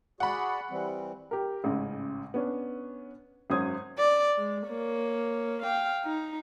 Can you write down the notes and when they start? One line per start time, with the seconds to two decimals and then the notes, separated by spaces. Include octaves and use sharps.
0.20 F#4 G#4 D5 F#5 B5
0.71 E3 G3 C4
1.31 G4 A#4
1.64 A1 G#2 C#3
2.34 B3 C#4 D4
3.50 G#1 F#2 C#4 C5 D#6 G#6
3.99 D5
4.38 G#3
4.67 A#3 C#5
5.62 F5 G5
6.05 D#4